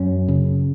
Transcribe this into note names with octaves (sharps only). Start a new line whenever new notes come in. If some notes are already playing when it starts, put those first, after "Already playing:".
Already playing: F#2 C#4
C#3